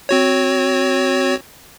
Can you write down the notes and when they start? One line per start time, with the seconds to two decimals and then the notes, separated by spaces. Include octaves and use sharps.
0.09 C4 F#4 C#5